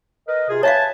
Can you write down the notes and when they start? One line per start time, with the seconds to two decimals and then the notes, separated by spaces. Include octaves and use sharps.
0.28 A#4 B4 D#5
0.49 C3 F4 G#4
0.63 B4 C#5 E5 F5 G#5 A5